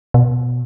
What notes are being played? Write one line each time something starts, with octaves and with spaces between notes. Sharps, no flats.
B2